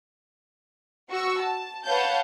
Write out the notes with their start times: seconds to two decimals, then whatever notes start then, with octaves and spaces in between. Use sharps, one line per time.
1.11 F#4 C#6 E6
1.41 A5
1.87 B4 C#5 F5 F#5 A5 G6